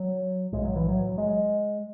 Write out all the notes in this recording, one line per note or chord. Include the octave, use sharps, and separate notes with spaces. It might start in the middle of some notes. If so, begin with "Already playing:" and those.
Already playing: F#3
B1 A2 G#3
F#3
E3
F#3
G#3